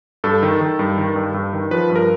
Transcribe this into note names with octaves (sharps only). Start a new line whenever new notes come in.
G2 A4
D#3
D#3
G2
D#3
G2
G2
D#3
F3 B4
G2
A#4